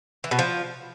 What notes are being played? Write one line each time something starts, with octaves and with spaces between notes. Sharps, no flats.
E3
B2
F3